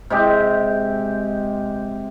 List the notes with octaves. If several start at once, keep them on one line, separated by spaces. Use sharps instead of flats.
C3 G#3 G4